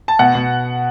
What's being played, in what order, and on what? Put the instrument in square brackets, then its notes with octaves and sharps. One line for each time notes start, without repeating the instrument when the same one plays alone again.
[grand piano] A5
B2 F#5
B2